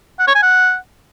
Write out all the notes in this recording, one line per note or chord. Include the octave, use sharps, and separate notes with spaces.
F#5
C#5
G#5
F#5